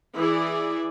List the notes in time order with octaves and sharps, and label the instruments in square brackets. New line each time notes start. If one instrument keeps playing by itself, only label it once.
[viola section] E3 E4 G#4 D5